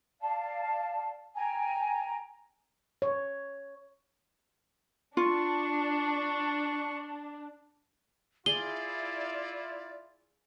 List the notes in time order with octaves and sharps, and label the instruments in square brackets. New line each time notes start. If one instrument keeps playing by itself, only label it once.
[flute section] D5 F5 A5
G5 G#5 A#5
[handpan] C#5
[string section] D4 [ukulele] F4 [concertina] C#6
[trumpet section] E4 F4 [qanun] G#4 [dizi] D5 [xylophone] G7